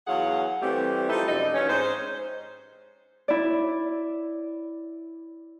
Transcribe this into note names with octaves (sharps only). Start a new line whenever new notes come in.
E2 F#3 G#4 F5 F#5
E3 G3 A3 C4 G4
F3 D#4 E4 A4
F#2 C3 D#4 D5 D#5
E3 F3 C#4
G#2 D#4 C5
E4 D5